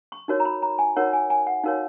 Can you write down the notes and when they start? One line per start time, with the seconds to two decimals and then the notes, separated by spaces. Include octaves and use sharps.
0.12 C#6
0.28 D#4 F#4 A#4 C#5
0.40 A#5
0.45 B5
0.62 A#5
0.79 G#5
0.96 D#4 F#4 A#4 C#5 F#5
1.13 G#5
1.30 G#5
1.47 F#5
1.64 D#4 F#4 A#4 C#5 F5